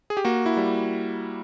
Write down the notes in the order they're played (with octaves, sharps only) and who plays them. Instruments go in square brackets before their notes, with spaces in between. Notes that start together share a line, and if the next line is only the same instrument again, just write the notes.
[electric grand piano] G#4
G4
A#3 F#4
E4
G3